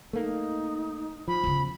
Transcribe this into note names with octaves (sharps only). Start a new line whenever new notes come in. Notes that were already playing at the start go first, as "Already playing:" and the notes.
A3 A#3 D#4
F3 B5
E2 C#3